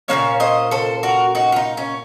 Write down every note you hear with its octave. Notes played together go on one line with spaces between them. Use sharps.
A#2 F#3 A#3 C#4 C#5 F5
C5 D#5
A4 C5
F#4 A#4
D#4 F#4
F4
D#4
C#4